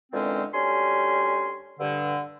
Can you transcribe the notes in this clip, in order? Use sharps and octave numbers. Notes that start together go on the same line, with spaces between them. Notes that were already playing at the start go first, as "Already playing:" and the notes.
A#2 D3 E3 G#3 C4 C#4
D2 G3 C#4 G#5 C6
G2 D3